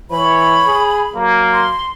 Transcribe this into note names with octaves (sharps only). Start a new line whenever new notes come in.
E3 C#5 B5
G#4
F#3 A#3
C6